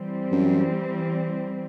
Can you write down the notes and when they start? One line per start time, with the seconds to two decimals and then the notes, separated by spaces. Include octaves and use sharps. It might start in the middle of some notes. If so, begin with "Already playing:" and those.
Already playing: E3 G3 C4
0.32 F#2